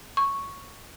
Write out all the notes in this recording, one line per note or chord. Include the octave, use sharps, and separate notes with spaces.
C#6